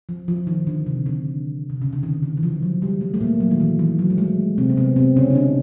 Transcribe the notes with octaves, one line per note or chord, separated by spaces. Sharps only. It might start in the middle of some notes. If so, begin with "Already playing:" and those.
F3
F3
D#3
D3
C3
D3
C3
C#3
D3
D#3
D#3
E3
F3
F#3
G3
A3
A3
A#2 A#3
F#3
D#3
E3
E3
F#3
A3
G#3
C3 C4
B3
C3 C4
C3 C4
C#3 C#4
D#4
D3 D4